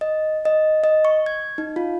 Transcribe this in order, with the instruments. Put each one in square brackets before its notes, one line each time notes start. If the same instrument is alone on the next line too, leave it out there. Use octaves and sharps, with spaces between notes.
[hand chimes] D#5
D#5
D#5
C#6
G#6
D#4
F4